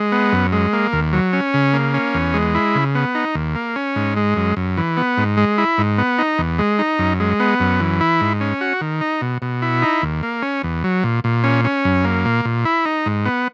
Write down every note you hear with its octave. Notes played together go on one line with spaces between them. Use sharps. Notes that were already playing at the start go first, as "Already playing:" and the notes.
Already playing: G#3
B3
F#2
G#3
A#3
D#2
F#3
C#4
C#3
A#3
C#4
E2
G#3
E4
C#3
B3
D#4
D#2
A#3
C#4
G#2
G#3
F#2
F#2
E3
B3
G#2
G#3
E4
G#2
B3
D#4
E2
G#3
D#4
F#2
G#3
B3
F#2
E3
E4
G#2
C#4
F#4
D#3
D#4
B2
B2
E4
D#4
D#2
A#3
C#4
E2
F#3
A#2
A#2
C#4
C#4
F#2
A#3
A#2
A#2
E4
D#4
G#2
B3